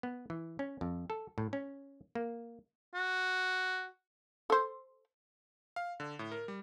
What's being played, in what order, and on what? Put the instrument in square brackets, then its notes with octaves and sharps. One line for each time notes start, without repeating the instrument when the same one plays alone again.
[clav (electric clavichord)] B3
E3
C#4
F2
A4
A2
C#4
A#3
[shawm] F#4
[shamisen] A4 C5
[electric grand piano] F5
D3
A2
A#4
G3